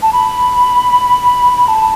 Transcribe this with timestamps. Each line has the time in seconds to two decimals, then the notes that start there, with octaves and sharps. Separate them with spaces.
0.02 A5
0.13 B5
1.68 A5